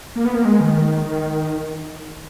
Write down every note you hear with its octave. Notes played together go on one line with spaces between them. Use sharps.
A#3
B3
A#3
G#3
D#3
D#3